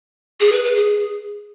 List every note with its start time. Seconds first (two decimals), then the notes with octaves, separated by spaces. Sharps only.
0.40 G#4
0.52 B4
0.64 B4
0.75 G#4